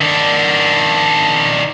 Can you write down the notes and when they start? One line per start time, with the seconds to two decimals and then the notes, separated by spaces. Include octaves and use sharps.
0.01 D#3 D4